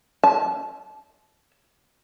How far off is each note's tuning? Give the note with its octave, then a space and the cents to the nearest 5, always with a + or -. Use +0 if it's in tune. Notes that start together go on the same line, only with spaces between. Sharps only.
A5 -25